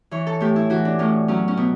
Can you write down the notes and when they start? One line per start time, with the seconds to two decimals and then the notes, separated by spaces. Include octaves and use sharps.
0.11 E3 C#5
0.27 A4
0.41 A2 G4
0.56 E4
0.70 E3 F#4
0.85 D4
0.99 A2 C#4
1.28 F#3 C#4
1.48 C#4
1.57 B2